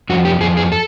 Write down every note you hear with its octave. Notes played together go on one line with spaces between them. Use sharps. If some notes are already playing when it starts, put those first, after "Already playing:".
F2 F#4
G4
F2 G#4
G#4
A4